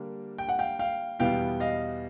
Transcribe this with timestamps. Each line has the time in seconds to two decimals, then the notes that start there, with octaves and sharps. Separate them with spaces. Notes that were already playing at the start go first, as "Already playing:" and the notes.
Already playing: D3 G3 A#3 D4
0.38 G5
0.49 F#5
0.59 F5 G5
0.79 F5 G5
1.19 E2 B2 G3 B3 E4 F5 G5
1.60 D#5 F5